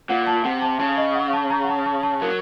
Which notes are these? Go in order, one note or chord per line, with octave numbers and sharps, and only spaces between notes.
A#2 F#5
A5
C3 F#5
A5
C#3 A5
D#5
F#5
A5
A#5
F#5
A5
A5
A5
F#3 A#4